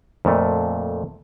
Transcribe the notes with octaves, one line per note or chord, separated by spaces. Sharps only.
F2 A#2 A3